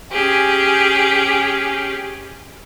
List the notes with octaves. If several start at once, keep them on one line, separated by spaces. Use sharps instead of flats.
C#4 G4 G#4